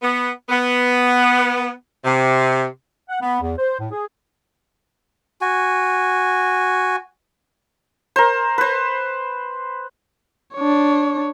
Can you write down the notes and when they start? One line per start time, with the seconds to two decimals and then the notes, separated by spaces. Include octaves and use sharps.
0.02 B3
0.49 B3
2.04 C3
3.09 F#5
3.21 B3
3.42 E2
3.58 C5
3.79 A2
3.92 G#4
5.41 F#4 G#5
8.16 A#4 C5
8.58 B4 C5
10.55 D4 C#5